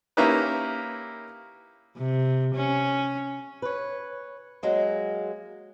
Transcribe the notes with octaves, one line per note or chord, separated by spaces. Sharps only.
A#3 C#4 D#4 E4 G4 B4
C3
C#4
B4 C#5
F#3 G#3 A#3